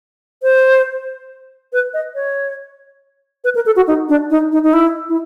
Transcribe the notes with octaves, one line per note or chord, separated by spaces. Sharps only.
C5
B4
D#5
C#5
B4
A#4
A4
F#4
D#4
D4
D#4
D#4
D#4
E4
E4